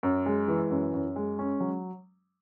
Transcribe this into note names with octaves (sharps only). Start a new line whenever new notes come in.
F#2
G#3
E3
F#2
F#2
G#3
C#4
F#3